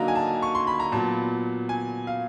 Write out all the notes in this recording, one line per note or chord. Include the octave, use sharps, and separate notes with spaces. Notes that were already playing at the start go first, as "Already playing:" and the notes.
Already playing: D3 F#3 A#3 D#4 A#5
G#5
A5
C#6
C6
B5
A#5
A#2 F#3 B3 A5
G#5
F5